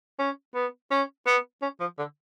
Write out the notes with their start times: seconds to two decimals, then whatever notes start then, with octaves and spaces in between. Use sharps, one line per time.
0.19 C#4
0.55 B3
0.91 C#4
1.27 B3
1.62 C#4
1.80 F3
1.98 D3